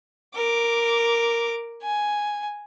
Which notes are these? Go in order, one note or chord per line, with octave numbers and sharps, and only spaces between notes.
A#4 D6
G#5